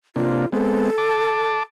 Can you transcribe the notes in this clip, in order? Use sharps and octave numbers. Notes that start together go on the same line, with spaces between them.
C3 A#3 D4 F4
G#3 B3 C4 A4
A5 D6